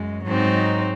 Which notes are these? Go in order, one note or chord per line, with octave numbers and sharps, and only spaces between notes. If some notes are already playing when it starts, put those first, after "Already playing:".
Already playing: F#2 G#3
G#2 F#3 C4 D#4